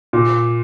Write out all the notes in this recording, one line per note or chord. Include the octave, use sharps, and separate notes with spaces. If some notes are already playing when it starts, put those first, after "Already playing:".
A#2